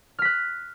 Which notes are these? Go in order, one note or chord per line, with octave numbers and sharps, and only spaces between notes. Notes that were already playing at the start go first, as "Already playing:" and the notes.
F6 F#6 B6